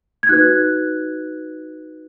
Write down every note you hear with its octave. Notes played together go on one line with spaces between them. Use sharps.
G#6
D#4 F#4 B4 F#6